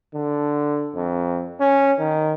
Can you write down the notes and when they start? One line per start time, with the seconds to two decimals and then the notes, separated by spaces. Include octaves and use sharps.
0.15 D3
0.96 F2
1.60 C#4
1.99 D#3